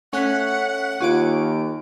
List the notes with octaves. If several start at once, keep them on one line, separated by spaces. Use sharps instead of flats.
A3 C#4 F#5 C#6 F#6 B6
D#2 F4 G#5 C#6 D6 D7